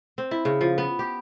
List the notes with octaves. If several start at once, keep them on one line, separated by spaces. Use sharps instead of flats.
C4
E4
C#3
F3
B3
G4